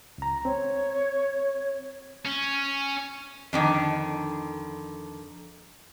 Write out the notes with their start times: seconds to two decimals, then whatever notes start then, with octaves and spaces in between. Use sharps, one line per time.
0.18 C#2 A#5
0.45 C4 C#5
2.25 C#4
3.53 F2 D3 D#3